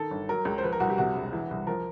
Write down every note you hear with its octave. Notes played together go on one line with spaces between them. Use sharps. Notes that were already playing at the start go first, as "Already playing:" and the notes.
Already playing: D#3 A4
G1
F#3 A#4
C#2
C5
F3 B4
A#4
C2 F#4
G4
C3 F#4
E1
E3
C2
F3 A#4